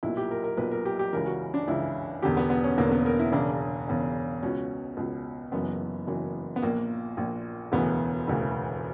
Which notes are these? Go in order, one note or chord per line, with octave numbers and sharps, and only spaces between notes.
B1 A#2 E4
G4
A#4
A#4
B1 A#2 B4
A#4
G4
G4
C#2 C#3 E3 A#4
F#4
D4
C#2 C#3 E3 E4
E1 E2 D3 G4
B3
B3
C#4
E1 E2 D3 A#3
B3
A#4
E4
E1 E2 C#3 D4
E1 E2 C#3
C#2 B2 C#4
C#2 B2
F#1 F#2 E3 B3
F#1 F#2 E3
B3
A#1 A#2 A#3
A#1 A#2
E1 D2 C#3 E3 B3
E1 D2 C#3 E3